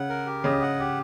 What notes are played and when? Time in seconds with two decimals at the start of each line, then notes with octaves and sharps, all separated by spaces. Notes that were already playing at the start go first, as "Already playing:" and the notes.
Already playing: C#3 F#5
0.09 A#4
0.26 G4
0.44 C#3 D#5
0.62 F#5
0.80 G4